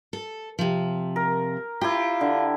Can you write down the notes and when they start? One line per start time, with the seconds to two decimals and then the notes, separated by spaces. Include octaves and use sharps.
0.13 A4
0.59 C3 F3
1.16 A#4
1.81 E4 F4 G4
2.21 D3